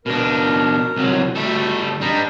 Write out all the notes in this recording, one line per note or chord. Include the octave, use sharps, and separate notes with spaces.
B2 D4 A#4
C2 F#3
G3 A3 F#4 A4
G3 D4 D#5 A#5